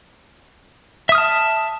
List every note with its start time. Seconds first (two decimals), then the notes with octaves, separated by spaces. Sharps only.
1.09 E5
1.12 D#6
1.15 F6
1.18 A5